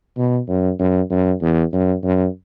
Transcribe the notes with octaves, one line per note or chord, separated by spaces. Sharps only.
B2
F#2
F#2
F#2
E2
F#2
F#2